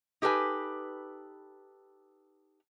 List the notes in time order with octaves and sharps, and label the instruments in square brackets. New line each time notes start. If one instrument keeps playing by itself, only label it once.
[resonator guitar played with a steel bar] D#4 G4 A4 B4 G#5